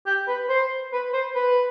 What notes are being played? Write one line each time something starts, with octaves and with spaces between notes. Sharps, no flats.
G4
B4
C5
B4
C5
B4